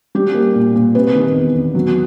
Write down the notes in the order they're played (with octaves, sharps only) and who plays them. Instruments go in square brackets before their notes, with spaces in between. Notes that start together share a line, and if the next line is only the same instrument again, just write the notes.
[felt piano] G3 G4
A#3
A#2
A#2
C3 B4
D#3
E2
E2
F#3